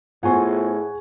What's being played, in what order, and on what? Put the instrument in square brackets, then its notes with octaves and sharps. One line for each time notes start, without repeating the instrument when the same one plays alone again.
[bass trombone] A2 [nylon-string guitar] B3 F4 C5 [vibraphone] G#4 [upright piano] F#5 G#5 C#6